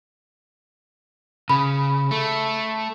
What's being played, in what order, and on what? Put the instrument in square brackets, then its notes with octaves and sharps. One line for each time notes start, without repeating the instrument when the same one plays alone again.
[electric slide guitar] C#3 [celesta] B5
[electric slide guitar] A3